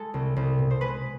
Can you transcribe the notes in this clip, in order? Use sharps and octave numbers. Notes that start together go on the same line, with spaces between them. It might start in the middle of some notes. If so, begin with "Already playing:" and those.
Already playing: G#3 A4
C2
C2
B2
C5
G#3 B4